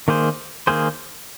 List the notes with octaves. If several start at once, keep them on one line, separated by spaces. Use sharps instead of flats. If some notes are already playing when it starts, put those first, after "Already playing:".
D#3 A#3 G#4 C5
D#3 A#3 G#4 C5